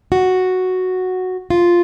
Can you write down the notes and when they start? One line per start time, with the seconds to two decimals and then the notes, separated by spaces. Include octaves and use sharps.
0.12 F#4
1.50 F4